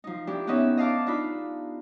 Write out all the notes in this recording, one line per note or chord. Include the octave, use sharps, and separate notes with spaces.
F3 D#4
D4 E4 G4
B3 C#4 D#4 E5
D#5 F5 A5 D6
D4 D#4 F4 B5